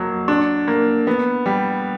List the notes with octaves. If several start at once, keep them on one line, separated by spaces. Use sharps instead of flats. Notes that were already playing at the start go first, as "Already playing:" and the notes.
Already playing: F2 F#3 A#3
D4
A#3
B3
G3